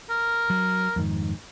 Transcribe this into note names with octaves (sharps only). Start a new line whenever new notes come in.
A#4
F#3
F2 G#2 D#3